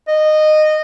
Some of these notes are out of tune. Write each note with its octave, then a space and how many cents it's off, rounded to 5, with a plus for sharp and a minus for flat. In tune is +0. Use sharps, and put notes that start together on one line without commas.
D#5 -15